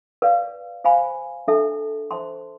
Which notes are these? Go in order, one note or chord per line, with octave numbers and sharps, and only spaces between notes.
B4 D5 F5
C5 F5 G#5 B5
D4 A4 E5 A5
C5 E5 A5 C6